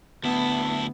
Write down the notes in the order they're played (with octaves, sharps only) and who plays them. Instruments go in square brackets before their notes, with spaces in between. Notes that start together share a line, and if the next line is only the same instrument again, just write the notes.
[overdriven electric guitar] D2 E4 [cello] B3 [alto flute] A5